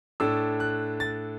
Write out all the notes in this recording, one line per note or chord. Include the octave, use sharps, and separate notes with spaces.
A2 A3 D4 E6
F#6
A6